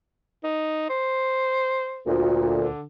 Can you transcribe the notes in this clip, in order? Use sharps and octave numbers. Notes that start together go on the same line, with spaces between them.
D#4
C5
D2 A#2
D3